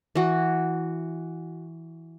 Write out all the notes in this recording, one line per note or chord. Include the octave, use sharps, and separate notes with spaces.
E3 F#4